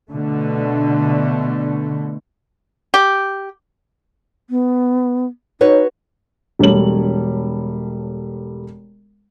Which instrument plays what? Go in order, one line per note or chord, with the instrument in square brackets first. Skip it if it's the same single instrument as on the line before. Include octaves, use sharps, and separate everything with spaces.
[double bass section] B2 D3 A3
[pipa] G4
[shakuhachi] B3
[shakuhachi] D#4 [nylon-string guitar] F#4 B4 C#5
[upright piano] E1 G3 A3 C#5 F#7